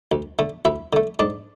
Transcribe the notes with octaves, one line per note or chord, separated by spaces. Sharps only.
D2
D3 A3
D2 E4 E5
D3 A3
G#2 D4 D5